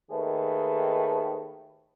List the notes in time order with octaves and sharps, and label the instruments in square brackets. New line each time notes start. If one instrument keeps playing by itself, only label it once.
[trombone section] D#2 D#3 A3 G#4 B4